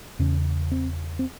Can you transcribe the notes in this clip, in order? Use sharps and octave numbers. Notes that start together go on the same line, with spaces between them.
E2 C#3 C#4
C4
C4